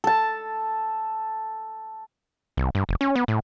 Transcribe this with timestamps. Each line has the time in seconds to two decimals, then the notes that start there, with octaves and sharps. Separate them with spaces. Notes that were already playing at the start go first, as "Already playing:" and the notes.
0.04 A4 A5
2.57 C2
2.75 G2
2.89 F1
3.01 C#4
3.16 B3
3.28 A2